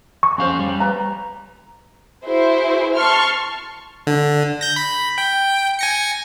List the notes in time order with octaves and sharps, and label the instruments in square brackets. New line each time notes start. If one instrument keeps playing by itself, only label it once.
[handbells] C#6
[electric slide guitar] F2 F5 [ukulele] C#4 C5
[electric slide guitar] G3
[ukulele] B4 A#5
[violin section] E4 F#4 G#4 C5
A5 C6 C#6 F6
[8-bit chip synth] D3
G6 A#6
B5
G5
G#5 A#6 C#7